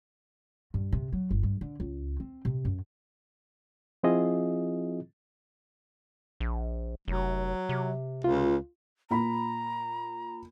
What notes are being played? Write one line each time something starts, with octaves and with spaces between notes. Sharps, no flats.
G2
C3
F#3
G1
G2
D3
C#2
C4
C3
F#2
F3 C4 E4 F4 G#4 D#5
A#1
F1 F#3
C3
C#2 F4
A#2 A#5 B5